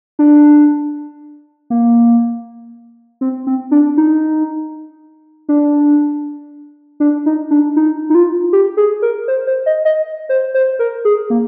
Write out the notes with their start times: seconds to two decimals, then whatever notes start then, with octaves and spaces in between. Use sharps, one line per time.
0.19 D4
1.70 A#3
3.21 C4
3.47 C4
3.71 D4
3.97 D#4
5.49 D4
7.00 D4
7.26 D#4
7.51 D4
7.76 D#4
8.10 D#4
8.15 F4
8.53 G4
8.77 G#4
9.02 A#4
9.28 C5
9.47 C5
9.66 D#5
9.85 D#5
10.29 C5
10.54 C5
10.79 A#4
11.05 G#4
11.30 A#3